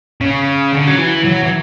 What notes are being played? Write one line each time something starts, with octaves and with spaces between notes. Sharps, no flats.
C#3
D3
F#3
E3
F#3
E3